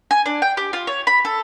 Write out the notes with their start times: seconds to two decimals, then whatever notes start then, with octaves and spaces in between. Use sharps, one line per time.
0.11 G#5
0.26 D4
0.42 G5
0.57 G4
0.73 F4
0.87 C#5
1.07 B5
1.25 A4